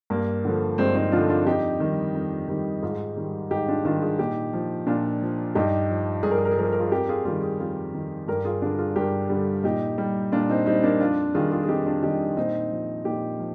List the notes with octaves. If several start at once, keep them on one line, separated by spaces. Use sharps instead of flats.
G2 A#3
D3 F3
G2 G#3 C4
C4 D#4
D3 F3 D4 F4
D4 F4
F2 D#4 G4
D#3 G3
F2
D#3 G3
G#2 F4 G#4
D#3 G3
G#2 D#4 G4
D4 F4
D#3 G3 D4 F4
F4 G#4
A#2 D#4 G4
F3
A#2 D4 F4
F3
G2 D#4 G4
F3
G2 G#4
A#4
G#4
A#4
G#4
F3 A#4
G#4
A#4
F4 G#4
F2 G4 A#4
F4 G#4
D#3 G3 F4 G#4
F4 G#4
F2 F4 G#4
D#3 G3
G2 G4 A#4
F4 G#4
D3 G3 D4 F4
F4 G#4
G2 G4 A#4
D3 G3
A#2 D#4 G4
G3
A#2 D4 F4
C4 D#4
G3 C4 D#4
A#3 D4
F2 D4 F4
D#3 G3 F4 G#4
F4 G#4
G#4
F2 D#4 G4
D4 F4
D#3 G3 D#4 G4
A#2 C4 D#4
F3
A#2 D#4 G4
F3